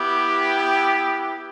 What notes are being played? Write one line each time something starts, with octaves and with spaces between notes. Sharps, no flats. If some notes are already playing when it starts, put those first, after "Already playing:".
Already playing: B3 E4 G4